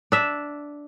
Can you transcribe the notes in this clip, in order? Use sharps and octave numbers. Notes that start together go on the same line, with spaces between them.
D4 E5